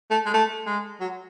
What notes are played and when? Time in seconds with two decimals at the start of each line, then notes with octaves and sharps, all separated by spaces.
0.11 A3
0.26 G#3
0.34 A3
0.67 G#3
1.00 F#3